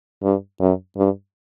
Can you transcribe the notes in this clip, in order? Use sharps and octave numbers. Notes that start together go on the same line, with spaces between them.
G2
F#2
G2